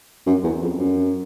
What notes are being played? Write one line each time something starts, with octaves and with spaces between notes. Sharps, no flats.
F#2
E2
F2
F#2